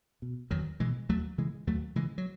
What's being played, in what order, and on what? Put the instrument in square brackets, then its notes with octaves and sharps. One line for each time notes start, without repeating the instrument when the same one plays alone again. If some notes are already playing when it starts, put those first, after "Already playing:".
[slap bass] B2
E2 D#3 F#3
B2 E3 G#3
D#2 F#3 A3
C#3 E3 G#3
D#2 F#3 A3
C#3 E3 G#3
F#3